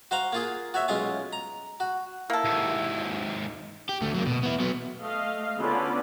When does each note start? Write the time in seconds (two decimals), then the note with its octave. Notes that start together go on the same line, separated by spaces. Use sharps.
0.11 F#4 C5 F5 A#5
0.33 A#3 F4 G#4
0.74 F#4 C#5 E5
0.88 B1 G#3 C#4 F4 G#5
1.33 A#5
1.80 F#4
2.30 A#3 E4 A4
2.45 D#2 G#2
3.89 G4
4.02 D2 A3
4.15 F#3 A#3
4.27 B2
4.43 B3 E4
4.60 F#3 B3
5.00 A3 D#5 F5
5.59 D3 B3 C#4 F4 D5